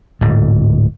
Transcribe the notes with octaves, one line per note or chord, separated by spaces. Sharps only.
D1 G#2